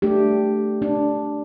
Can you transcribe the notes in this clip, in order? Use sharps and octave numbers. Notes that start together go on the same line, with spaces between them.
A3 D4 G4
D4